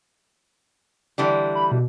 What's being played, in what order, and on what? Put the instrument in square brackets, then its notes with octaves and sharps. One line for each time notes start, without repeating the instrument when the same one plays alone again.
[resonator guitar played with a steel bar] D3 E3 G3
[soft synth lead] B5
B2